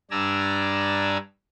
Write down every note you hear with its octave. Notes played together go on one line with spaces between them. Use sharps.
G2 D4 D5 G#5 A#5 E6